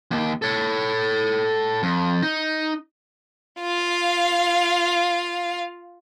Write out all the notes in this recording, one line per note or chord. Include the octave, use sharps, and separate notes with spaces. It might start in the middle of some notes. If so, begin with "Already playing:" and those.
D#2
A4 C#5
F2
D#4
F4 F5